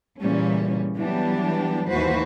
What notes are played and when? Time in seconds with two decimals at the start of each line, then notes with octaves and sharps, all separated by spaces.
0.22 A#2 C#3 E3 G3 C#4
0.97 E3 F#3 G3 B3 D4 G4
1.89 D#2 E3 F#4 B4 C5